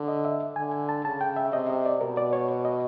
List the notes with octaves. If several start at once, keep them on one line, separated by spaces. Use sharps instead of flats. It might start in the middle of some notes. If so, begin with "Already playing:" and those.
Already playing: D3
D#5
E5
D3 G#5
A5
C#3 A5
G5
E5
C3 D#5
D#5
D5
B2 A#4
D5
C#5
D#5